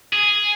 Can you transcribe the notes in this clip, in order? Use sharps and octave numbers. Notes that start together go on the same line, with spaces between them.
G#4